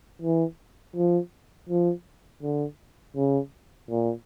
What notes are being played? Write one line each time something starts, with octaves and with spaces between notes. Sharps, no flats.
E3
F3
F3
D3
C#3
A#2